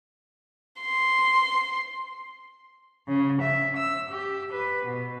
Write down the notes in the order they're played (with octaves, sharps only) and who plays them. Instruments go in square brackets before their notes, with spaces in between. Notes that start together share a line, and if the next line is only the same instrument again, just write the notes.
[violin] C6
[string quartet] C#3
E5
E6
G4
B4
B2